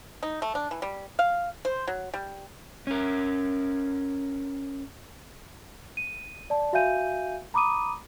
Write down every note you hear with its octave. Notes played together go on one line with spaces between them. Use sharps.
D#4
A3
D4
E3
G3
F5
C5
F#3
G3
C#4 A#4
D#7
D5 A5
F#4 E5 F5 G#5 G6 D#7
A#5 B5 D6 D#6 D#7